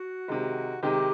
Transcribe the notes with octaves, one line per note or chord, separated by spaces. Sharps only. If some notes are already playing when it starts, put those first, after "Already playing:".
Already playing: F#4
C3 D#3 G#3
C3 D#3 G#3 G4